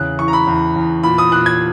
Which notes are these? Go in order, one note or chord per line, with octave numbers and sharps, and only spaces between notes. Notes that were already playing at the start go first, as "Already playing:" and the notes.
Already playing: E2 C#3 F#6
E3 C#6
A#5
B5
E2
E2
A#2 B5
D#6
A#2 F#6
G#6